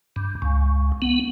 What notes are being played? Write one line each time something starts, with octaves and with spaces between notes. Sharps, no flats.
G2
C#2
B3